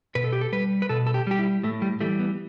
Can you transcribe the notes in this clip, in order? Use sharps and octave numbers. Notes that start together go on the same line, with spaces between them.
B2 B4
A4
G4
A4
G3 B4
B4
B2 A4
A4
G4
G3 G4
E4
A2 A3
G3
E3 G3 A3
B3